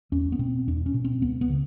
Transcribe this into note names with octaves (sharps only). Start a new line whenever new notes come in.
E2 C#4
B3
B2 C4
E2 D4
C#4
B2
C4
C#2 B3
B3
C#3